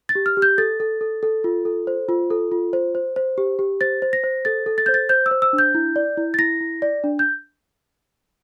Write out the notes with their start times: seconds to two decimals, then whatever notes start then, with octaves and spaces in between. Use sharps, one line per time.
0.09 A6
0.15 G4
0.26 F6
0.37 G4
0.42 G6
0.58 A4 A6
0.80 A4
1.01 A4
1.23 A4
1.44 F4
1.65 A4
1.87 C5
2.09 F4
2.30 A4
2.52 F4
2.73 C5
2.95 C5
3.16 C5
3.38 G4
3.59 G4
3.81 C5 A6
4.02 C5
4.13 A#6
4.24 C5
4.45 A4 A6
4.66 A4
4.78 A6
4.86 C5 G6
4.94 A6
5.09 C5 G6
5.26 E6
5.31 C5
5.42 E6
5.53 D4
5.58 G6
5.75 E4
5.96 D5
6.17 E4
6.34 A6
6.39 E4 A#6
6.61 E4
6.82 D5
7.04 D4
7.19 G6